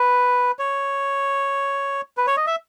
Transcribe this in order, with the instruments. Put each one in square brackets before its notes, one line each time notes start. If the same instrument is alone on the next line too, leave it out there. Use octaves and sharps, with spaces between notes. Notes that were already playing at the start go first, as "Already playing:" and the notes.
Already playing: [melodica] B4
C#5
B4
C#5
D#5
E5